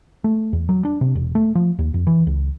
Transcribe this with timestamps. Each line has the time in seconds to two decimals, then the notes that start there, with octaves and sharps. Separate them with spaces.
0.24 A3
0.53 E2
0.69 F#3
0.85 D4
1.01 C3
1.15 E1
1.35 A3
1.55 F3
1.79 D#2
1.94 F2
2.07 E3
2.27 C#2